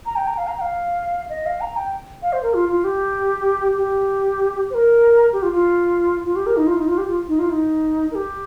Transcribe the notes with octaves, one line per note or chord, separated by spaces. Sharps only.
A#5
G5
A#5
F5
A#5
G5
F5
D#5
F5
A#5
G5
F5
C5
A#4
F4
F4
G4
G4
C5
A#4
G4
F4
F4
F4
G4
A#4
D#4
F4
D#4
F4
G4
F4
D#4
F4
D#4
A#4
G4